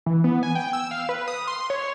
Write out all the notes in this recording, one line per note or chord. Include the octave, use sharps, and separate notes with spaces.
E3
B3
G#5
G5
E6
F5
B4
D#6
C6
C#5